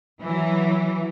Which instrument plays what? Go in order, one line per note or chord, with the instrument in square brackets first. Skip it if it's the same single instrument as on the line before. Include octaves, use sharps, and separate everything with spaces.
[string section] E3 F#3